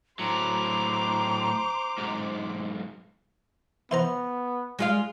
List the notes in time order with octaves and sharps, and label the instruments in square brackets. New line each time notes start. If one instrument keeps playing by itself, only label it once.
[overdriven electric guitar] A2 F#3 [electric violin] C5 D6 [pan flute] A#5
[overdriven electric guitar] B1 G#2
[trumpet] B3 [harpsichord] E4 C5 A#5
[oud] G#3 F4 F5